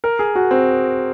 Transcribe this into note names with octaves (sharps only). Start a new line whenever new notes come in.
A#4
G#4
F#4
C4